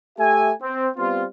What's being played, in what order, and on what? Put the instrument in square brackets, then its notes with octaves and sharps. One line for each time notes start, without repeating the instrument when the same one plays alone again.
[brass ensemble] A3 G4 E5 G#5
C4
G3 B3 C4 F4